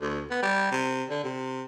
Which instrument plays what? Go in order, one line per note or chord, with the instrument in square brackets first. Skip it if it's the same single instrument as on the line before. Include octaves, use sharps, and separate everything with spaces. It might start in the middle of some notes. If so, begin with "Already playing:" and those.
[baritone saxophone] D2
B3
G3
C3
D3
C3